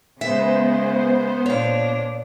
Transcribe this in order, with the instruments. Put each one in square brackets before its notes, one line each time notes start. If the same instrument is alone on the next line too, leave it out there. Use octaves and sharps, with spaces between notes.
[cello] C#3 G#3 [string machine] B3 C5 [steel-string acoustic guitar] E5
[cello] A#2 D4 [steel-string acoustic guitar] C#5 F5